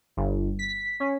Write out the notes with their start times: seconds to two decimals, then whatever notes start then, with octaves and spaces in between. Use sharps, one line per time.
0.17 G1
0.59 B6
1.00 C#4